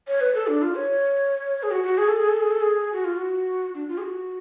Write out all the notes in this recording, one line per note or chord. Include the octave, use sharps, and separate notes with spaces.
C#5
B4
A4
D4
F4
C#5
G#4
F#4
F#4
G#4
A4
G#4
A4
G#4
A4
G#4
F#4
F4
F#4
D4
F4
G#4
F#4